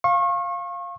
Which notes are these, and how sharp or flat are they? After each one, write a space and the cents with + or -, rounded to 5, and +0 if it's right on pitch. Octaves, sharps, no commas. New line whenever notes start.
F5 +0 C#6 -35